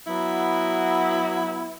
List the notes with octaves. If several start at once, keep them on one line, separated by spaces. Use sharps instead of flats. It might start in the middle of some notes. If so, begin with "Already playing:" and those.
F#3 B3 E4